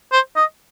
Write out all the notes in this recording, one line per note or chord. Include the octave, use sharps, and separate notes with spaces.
C5
D#5